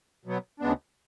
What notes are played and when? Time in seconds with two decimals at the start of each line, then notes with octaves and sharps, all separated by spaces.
0.25 B2 F#3 B3
0.60 D2 C#3 G#3 B3 D4